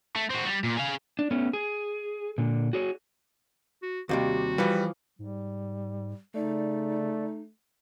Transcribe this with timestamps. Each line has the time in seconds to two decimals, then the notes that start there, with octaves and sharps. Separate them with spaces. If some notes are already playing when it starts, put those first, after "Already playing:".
0.16 A3
0.30 C4 F#4
0.47 G3
0.64 A#2
0.77 G#4 F5
1.19 D4
1.31 A3 B3 C#4
1.53 G#4
2.38 A#2 D3
2.73 F#4 G#4 C#5
3.83 F#4
4.09 D#2 C3 G3 F#4
4.58 E3 F3 G3 B4
5.19 G#2 G3
6.35 C#3 A3 D#4 D5